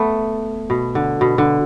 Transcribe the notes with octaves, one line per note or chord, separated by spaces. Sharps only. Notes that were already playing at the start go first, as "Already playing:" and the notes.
Already playing: A3 B3
B2
D3
B2
D3